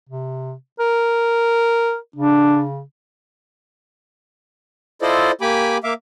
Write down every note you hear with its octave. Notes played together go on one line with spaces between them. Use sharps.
C3
A#4
C#3 D4
E4 F4 A4 C5 D5 D#5
A#3 G4 G#5 B5 D6
A#3 E5 F5 D6